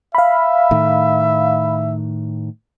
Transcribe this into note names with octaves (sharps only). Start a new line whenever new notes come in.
E5 F5 B5
A2 D#3